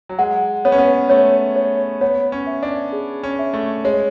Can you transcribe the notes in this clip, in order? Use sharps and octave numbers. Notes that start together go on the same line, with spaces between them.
F#3
G#3 F#5
B3 C#5
C#4
B3
A3 C#5
C#5
B3 C#5
C#4
E5
D4
G#4
C#4
E5
A3
G#3 C#5